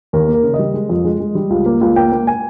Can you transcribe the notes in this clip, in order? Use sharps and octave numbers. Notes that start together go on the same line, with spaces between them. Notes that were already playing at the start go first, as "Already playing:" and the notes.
D#2 A#4
A#3
A#4
C#3
D#5
G3
G#3
F2
G#3
G#3
G3
C#2
A#3
C#2
A#3 G5
A#3
G#5